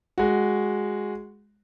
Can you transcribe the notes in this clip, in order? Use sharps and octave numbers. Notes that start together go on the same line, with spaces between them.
G#3 F#4